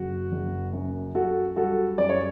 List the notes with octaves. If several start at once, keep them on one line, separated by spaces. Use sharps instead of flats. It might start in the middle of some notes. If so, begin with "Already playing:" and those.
Already playing: F#1 F#4
F#1
F#2
F#2 F#4 A4
G3 F#4 A4
F#2 D5
C#5